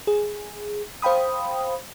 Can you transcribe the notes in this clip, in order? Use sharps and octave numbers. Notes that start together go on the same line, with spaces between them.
G#4
C5 F5 G5 B5 D#6